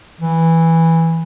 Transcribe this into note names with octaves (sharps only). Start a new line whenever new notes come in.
E3